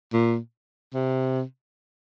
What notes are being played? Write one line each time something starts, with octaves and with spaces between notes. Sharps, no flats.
A#2
C3